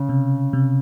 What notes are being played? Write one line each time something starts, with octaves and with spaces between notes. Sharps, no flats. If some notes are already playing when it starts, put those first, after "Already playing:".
Already playing: C#3
C3
C3